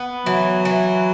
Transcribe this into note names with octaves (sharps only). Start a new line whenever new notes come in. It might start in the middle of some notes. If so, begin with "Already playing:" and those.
Already playing: B3
E3 F#3
E3